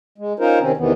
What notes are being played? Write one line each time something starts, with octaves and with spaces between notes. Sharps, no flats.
G#3
C#4 D#4 F4 A#4 C5
C3 D#3 C4 C#4
E2 C3 D#3 E3 B3